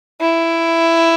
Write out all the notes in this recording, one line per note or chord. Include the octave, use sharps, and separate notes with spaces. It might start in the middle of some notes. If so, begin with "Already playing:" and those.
E4